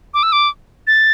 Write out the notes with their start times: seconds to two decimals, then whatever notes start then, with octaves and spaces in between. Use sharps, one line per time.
0.14 D6
0.23 E6
0.32 D6
0.87 A6